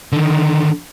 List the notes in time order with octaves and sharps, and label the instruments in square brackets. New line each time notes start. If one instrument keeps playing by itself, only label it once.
[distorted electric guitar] D3 D#3